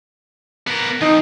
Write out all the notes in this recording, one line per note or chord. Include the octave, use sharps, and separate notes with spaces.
B3 A#4
F3 C4 D#4